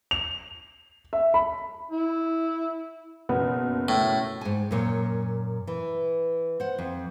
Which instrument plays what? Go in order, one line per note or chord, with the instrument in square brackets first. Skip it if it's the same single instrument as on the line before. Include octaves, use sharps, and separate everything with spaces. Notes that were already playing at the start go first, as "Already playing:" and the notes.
[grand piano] F7
E5
B5
[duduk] E4
[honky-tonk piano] F#1 B2 [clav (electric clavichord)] B3
[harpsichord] A2
[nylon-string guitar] G#2 G#5
F#2 A#2 C#5
E3
C5 F#5
F2